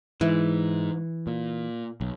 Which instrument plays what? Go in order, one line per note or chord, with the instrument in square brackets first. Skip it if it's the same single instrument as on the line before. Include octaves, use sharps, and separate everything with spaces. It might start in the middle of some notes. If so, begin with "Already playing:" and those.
[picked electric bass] G#2 [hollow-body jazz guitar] E3
[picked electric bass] A#2
B1